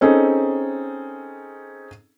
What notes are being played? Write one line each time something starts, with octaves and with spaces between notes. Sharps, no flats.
C4 C#4 D#4 G#4 A4